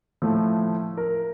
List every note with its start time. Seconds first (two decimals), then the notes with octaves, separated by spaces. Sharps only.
0.22 A2 F3 A3
0.97 A#4